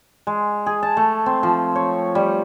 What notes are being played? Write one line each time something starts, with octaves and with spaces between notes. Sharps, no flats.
G#3
G#4
A5
A3
C4
F3
C#5
G3